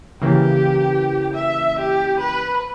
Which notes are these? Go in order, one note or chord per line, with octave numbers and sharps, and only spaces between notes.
C#3 E3 A#3 G4
E5
G4
B4